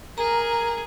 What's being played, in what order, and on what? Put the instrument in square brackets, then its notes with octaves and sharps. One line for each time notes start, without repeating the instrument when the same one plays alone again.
[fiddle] G#4 [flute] A#4 [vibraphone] A#5